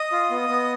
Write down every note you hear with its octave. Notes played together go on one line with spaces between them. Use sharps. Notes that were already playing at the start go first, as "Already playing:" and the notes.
Already playing: D#5 D#6
F4
B3
B3